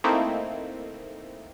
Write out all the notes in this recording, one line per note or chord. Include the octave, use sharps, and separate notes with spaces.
A3 A#3 C4 D#4 E4